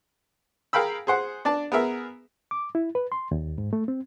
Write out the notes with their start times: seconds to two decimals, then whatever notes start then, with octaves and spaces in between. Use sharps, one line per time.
0.73 G#4 A#4 F5 G5 B5 E6
1.07 G#4 C5 F#5
1.45 D4 D5 A5
1.72 B3 G#4 A#4 E5
2.51 D6
2.75 E4
2.95 B4
3.12 C6
3.31 D#2
3.58 G#2
3.73 A3
3.88 C4